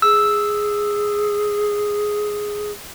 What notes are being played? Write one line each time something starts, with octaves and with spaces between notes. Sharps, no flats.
G#4 E6